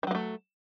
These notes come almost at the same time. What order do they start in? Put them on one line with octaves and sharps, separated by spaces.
D#3 F#3 A#3 A3